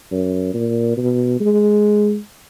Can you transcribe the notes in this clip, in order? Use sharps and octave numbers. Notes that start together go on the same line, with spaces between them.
F#2
A#2
B2
G#3